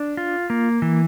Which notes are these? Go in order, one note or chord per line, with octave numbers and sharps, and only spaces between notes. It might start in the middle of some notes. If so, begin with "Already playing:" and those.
Already playing: D4
F4
A#3
E3